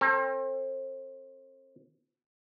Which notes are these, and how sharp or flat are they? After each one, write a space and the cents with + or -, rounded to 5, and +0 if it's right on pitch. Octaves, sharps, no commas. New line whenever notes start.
C4 +35 A4 +30